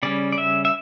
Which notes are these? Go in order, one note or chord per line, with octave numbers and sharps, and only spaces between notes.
C#3 G3 C#4 D5
D5
E5
E5